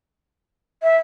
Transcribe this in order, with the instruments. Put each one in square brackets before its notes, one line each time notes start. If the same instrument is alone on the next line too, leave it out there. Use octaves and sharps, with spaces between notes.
[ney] E5